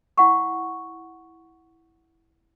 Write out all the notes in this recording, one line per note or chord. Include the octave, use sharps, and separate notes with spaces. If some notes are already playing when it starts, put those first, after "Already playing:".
E4 F#5 C#6